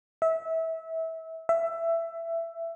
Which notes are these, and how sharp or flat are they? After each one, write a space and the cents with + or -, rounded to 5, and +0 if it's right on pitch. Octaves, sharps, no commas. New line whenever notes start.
E5 -25
E5 +15